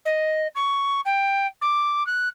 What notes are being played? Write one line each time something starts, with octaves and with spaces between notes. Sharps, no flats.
D#5
C#6
G5
D6
F#6